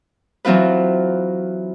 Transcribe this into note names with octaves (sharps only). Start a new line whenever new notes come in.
E3 F#3 C4 F4 B4